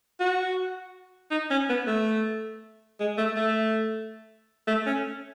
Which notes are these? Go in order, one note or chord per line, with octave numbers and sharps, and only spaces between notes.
F#4
D#4
C#4
B3
A3
G#3
A3
A3
A3
C#4